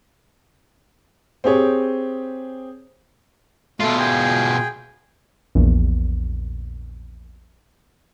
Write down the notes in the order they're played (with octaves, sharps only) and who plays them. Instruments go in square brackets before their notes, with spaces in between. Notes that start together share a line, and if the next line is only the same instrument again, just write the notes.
[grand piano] C4 G4 G#4 C#5
[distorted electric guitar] B2 F4 [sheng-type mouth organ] A3
[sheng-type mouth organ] G#4 G5
[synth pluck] A#1 E2